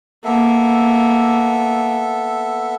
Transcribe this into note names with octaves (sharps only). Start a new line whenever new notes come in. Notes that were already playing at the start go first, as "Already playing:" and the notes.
A#3 B3 A4 E5